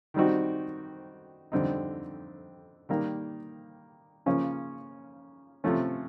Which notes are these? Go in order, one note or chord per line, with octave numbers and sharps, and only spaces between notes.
D#3 G3 C4 D#4 F#4
F2 D3 G3 C4 D#4
D#3 G3 A#3
C#3 F3 A#3 C#4
C3 F3 A3 C#4